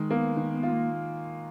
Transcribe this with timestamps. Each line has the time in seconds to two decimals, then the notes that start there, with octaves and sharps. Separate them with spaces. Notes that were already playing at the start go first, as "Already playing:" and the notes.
Already playing: D#3 G#3
0.11 A#3 B3
0.37 D#3 B3
0.54 B3
0.63 F4
0.71 A#3